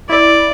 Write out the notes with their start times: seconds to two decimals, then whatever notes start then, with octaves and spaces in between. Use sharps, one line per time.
0.09 E4 D5